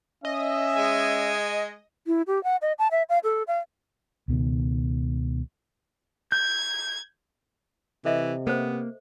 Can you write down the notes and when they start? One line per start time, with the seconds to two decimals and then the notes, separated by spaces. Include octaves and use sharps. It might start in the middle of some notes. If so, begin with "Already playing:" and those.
0.25 C#4 D#5 E5
0.77 G#3 G#5
2.07 E4
2.27 G4
2.44 F#5
2.62 D#5
2.79 A5
2.91 E5
3.09 F5
3.24 A4
3.47 F5
4.28 C#2 B2 D#3
6.32 G6 G#6
8.05 C3 E3 A4 D#5 E5
8.47 A#3 B3 A4 C5